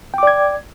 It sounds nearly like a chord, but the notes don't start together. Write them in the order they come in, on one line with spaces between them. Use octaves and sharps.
G5 D6 D5 G#6